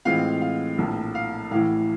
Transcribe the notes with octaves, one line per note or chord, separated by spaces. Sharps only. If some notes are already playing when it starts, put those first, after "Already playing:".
A2 E3 G#3 C4 F4 F5
F5
A#1 A2 F3
F5
A1 A2 E3 F5